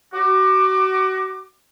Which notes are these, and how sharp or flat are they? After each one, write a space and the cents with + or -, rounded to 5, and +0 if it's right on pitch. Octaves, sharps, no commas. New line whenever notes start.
F#4 +35 D6 +20